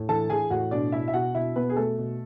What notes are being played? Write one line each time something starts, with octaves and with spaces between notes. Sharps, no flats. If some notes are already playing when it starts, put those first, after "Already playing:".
Already playing: A2
E3 A4 A5
E3 G#4 G#5
A2 F#4 F#5
B2 D4 D5
B2 E4 E5
E5
B2 F#4 F#5
B2 E4 E5
B2 B3 B4
G#4
B2 A3 A4
B2